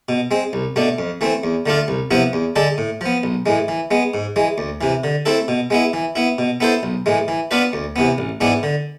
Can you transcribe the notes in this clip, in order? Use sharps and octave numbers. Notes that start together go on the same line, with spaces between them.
B2
G#3 C4
C2
B2 A3 D4
F2
E3 A3 C4
E2
D3 A3 D4 F4
C2
C3 F3 B3 E4
E2
D3 G#3 D4 A4
A2
F3 B3
B1
A2 E3 G#3
E3
G#3 B3
G#2
E3 G#3
D2
C3 E3
D3
A3 C4 E4 A4
B2
G#3 B3 E4
E3
B3 E4
B2
B3 E4 A4 C5
B1
A2 E3 G#3
E3
B3 D4 F4 B4
D2
C3 E3 B3
A1
G#2 E3 B3 D4
D3